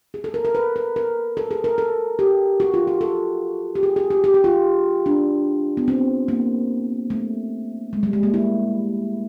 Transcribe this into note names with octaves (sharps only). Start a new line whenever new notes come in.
G#4
A4
A#4
A#4
B4
B4
A#4
A4
G#4
A#4
A4
G4
F#4
F4
F#4
A4
G4
G#4
G#4
G4
G4
G4
F4
D4
B3
C4
A#3
A3
G#3
G3
G#3
A#3
E4